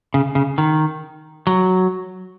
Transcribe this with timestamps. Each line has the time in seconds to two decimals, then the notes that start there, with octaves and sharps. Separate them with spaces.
0.14 C#3
0.35 C#3
0.58 D#3
1.47 F#3